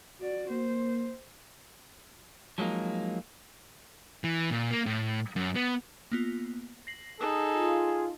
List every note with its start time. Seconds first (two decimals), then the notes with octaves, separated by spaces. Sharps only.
0.19 F#4 D5
0.50 A#3 C5
2.58 F3 F#3 G#3 A#3 D#4
4.24 E3
4.51 A#2
4.71 A#3
4.86 A2
5.36 F#2
5.55 B3
6.12 A#3 B3 F4
6.87 A#6 C7 F#7
7.21 D#4 G#4 A4
7.56 F4